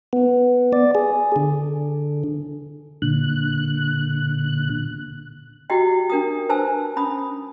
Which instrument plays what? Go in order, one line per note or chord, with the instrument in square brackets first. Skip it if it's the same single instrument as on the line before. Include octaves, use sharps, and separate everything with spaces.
[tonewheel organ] B3
D5
G#4
D3
A#2 D3 F#6
[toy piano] E4 F#4 G4 D#5 G5
D4 A#4 G5 D#6
B4 C5 G#5 A5 E6
C#4 B5 D#6